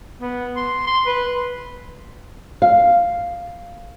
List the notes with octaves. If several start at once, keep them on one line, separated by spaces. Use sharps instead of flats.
B3
C6
C6
B4
F5